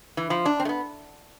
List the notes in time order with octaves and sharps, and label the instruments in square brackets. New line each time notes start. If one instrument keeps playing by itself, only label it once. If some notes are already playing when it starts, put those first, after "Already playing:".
[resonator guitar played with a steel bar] E3
F3
D4
C4
A3
B3